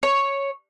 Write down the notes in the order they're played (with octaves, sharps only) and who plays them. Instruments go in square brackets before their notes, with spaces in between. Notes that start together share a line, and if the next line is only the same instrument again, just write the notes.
[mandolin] C#5